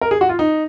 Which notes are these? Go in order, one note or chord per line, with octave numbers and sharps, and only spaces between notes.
A#4
G#4
F#4
F4
D#4